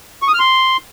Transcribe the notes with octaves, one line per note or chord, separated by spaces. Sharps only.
C#6
D#6
F6
C6